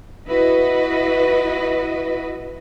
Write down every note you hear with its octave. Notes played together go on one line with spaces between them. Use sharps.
E4 F#4 B4 D#5